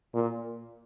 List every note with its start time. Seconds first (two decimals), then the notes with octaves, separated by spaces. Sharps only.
0.14 A#2